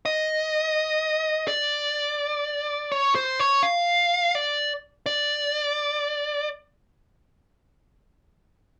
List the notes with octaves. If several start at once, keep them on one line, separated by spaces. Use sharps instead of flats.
D#5
D5
C#5
C5
C#5
F5
D5
D5